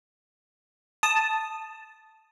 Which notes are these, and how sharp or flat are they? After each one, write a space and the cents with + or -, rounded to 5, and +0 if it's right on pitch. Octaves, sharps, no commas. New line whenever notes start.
A5 +0 D#6 -5